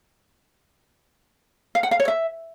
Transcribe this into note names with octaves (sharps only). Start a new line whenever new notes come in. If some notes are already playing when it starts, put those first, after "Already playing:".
F5
F#5
F5
C#5
E5